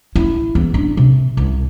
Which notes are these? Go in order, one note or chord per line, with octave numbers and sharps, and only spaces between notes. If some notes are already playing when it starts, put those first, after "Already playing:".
E4
E2
D4
C3
C2